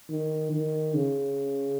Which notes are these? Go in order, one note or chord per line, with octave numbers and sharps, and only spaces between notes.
D#3
D#3
C#3